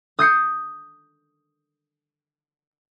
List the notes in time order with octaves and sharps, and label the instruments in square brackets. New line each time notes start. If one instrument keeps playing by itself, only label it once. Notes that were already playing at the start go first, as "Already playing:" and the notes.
[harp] D#6 G6 C7 C#7